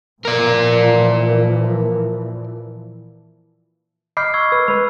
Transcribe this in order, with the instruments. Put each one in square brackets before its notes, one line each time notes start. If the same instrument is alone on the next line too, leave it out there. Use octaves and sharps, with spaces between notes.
[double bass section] A#2 E3 F3 [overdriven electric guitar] A#4 D5
[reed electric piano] D#5 B5 D6 [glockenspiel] F6 G6 C7
[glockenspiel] C#6 E6 G#6
[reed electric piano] B4 [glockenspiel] E6
[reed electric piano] G#3 B4 [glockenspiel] B5